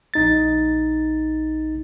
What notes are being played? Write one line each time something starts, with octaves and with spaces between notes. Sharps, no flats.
A#1 D#4 A6